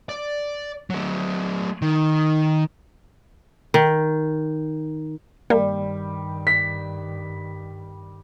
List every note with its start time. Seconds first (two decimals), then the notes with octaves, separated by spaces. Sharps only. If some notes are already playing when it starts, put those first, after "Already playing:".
0.09 D5
0.90 F#3 A3
1.82 D#3
3.74 D#3
5.50 G2 D#3 G3 A#3
6.47 B6